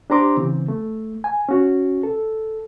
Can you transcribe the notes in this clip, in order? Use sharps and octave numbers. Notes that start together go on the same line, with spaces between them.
D4 G4 C5 A#5 C6 D6
C#3 E3 C4
A3
G#5
C#4 F#4
A4